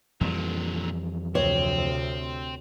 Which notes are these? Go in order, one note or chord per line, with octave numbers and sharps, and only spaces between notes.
F2 A#2 D3 E3 G3
D2 C3 C4 C#5